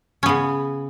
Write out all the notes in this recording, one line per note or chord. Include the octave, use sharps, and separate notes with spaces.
C#3 B3 C#4